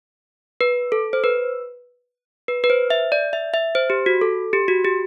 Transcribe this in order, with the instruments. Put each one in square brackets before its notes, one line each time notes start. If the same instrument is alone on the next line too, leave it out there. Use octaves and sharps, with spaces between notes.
[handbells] B4
A4
C5
B4
B4
B4
C5
E5
D5
E5
E5
C5
G4
F#4
A4
G4
F#4
G4